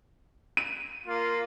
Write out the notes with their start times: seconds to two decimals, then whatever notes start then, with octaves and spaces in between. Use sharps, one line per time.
0.57 D#7
1.07 A#3 F4